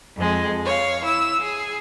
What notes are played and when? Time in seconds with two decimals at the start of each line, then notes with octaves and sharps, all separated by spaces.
0.17 F2 G#3
0.65 C#5 F5
1.03 E4 E6
1.39 G#4